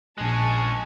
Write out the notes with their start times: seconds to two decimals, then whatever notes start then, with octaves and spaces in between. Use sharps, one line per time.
0.18 A#1 G#3 C#4 G#5 A5 F#6